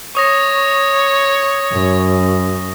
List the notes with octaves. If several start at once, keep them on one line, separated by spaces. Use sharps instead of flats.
C#5 C#6 D#6 A#6
F#2